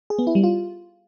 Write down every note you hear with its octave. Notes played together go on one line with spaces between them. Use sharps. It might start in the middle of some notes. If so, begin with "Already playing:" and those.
G#4
B3
E4
G3
F4